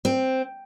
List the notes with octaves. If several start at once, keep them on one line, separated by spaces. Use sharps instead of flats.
C4